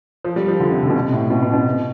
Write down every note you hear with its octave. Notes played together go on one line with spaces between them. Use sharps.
F3
G3
F3
D3
C3
D3
B2
C3
A2
B2
B2
B2
C3